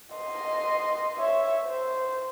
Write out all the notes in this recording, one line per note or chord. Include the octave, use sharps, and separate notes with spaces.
D#5 C6
C#5 E5
C5